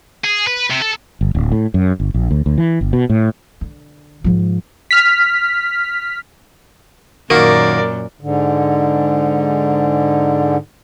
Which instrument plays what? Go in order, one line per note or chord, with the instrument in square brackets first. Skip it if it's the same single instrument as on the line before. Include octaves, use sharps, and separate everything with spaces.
[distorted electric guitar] G#4
B4
C3
A4
[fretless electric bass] G1
D1
A2
F#2
G1
A#1
D2
D2
E3
G1
B2
A2
[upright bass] D3
G#2 F3
[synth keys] F6 B6
[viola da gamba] F#2 A#2 [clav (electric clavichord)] D#3 F#4 [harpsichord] A#3 [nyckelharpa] A#4 D5
[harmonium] G#2 D3